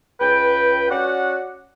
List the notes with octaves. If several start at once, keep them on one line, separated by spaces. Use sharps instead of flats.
C#2 B4 G5
C#4 F#4 D5 F#5